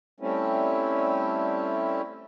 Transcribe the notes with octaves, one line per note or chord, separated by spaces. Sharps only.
G3 A3 C4 C#4 E4